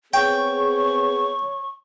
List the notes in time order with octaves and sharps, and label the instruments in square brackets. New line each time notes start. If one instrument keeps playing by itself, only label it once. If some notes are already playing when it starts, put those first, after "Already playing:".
[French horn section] B3 C4 G#4 [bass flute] C#5 [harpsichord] G5 [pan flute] C#6